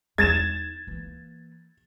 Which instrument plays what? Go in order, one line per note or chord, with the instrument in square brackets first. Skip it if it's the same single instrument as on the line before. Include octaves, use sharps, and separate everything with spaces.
[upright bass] E2 D#4 [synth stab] G#3 [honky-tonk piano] G#6 A6 E7
[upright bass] E3 A#3